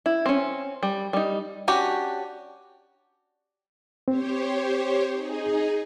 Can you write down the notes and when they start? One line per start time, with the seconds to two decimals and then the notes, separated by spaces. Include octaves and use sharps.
0.06 E4
0.26 C4 C#4
0.83 G3
1.13 G3 D#4
1.68 C#4 D4 F#4 G4
4.08 C4 G4 C5 C#5
5.11 D#4 G#4